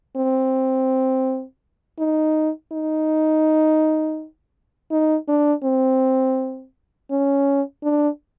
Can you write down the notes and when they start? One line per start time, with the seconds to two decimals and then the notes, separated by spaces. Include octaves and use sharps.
0.17 C4
1.99 D#4
2.73 D#4
4.91 D#4
5.28 D4
5.64 C4
7.11 C#4
7.83 D4